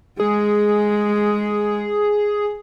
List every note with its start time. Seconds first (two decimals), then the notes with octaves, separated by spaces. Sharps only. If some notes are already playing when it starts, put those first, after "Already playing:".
0.20 G#3 G#4